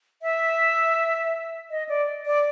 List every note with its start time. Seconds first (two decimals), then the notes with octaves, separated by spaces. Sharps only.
0.22 E5
1.70 D#5
1.89 D5
2.26 D5